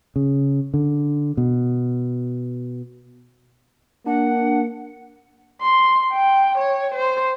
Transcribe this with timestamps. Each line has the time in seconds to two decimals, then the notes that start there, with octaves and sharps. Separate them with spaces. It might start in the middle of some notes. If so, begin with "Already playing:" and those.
0.16 C#3
0.74 D3
1.37 B2
4.06 A#3 D4 F#5
5.62 C6
6.13 G5
6.58 C#5
6.94 C5